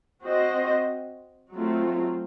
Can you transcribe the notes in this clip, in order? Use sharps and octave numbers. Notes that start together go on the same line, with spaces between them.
C4 F#4 C5 D#5
F#3 A3 C4 F4